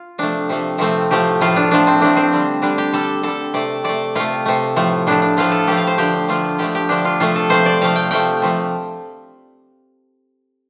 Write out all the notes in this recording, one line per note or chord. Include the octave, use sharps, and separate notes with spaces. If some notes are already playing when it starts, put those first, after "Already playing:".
Already playing: F4
C3 F3 A3 D4
C3 F3 A3
C3 F3 A3 C4
A2 F3 A3 G4
A2 F3 A3 F4
D4
A2 F3 A3 D4
C4
A2 F3 A3 D4
C4
D3 G3
D3 G3 D4
G4
D3 G3 A4
D3 G3 A4
C3 A3 D5
C3 A3 D5
C3 A3 F4
C3 A3
A2 F3 A3
A2 F3 A3 D4
D4
A2 F3 A3 F4
A4
A2 F3 A3 G4
F5
C5
D3 F3 A3 G4
D3 F3 A3 F4
D3 F3 A3 G4
G4
D3 F3 A3 D4
F4
C3 F3 A3 F4
A4
C3 F3 A3 C5
D5
C3 F3 A3 F5
G5
C3 F3 A3 G5
C3 F3 A3